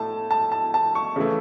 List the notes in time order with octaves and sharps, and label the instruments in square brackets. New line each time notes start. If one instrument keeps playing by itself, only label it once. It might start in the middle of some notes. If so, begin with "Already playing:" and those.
Already playing: [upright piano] A2 A3 E4 A5
A5
A5
A5
C#6
C#3 E3 A3 E4